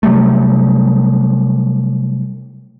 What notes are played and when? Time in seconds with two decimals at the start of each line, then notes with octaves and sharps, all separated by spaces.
0.03 C3 F#3 G3 A3